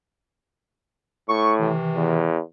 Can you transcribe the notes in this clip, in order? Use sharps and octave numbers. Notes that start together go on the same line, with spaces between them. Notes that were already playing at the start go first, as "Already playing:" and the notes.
A2 C#6
C3 D#3 E3
E2